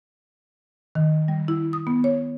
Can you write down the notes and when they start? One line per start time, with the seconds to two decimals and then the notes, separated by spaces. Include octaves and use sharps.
0.95 D#3
1.28 G3
1.48 E4
1.73 D#6
1.87 B3
2.04 C#5